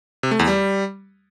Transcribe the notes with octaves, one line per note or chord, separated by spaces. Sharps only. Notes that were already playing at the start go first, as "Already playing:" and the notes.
C3
A3
E2
G3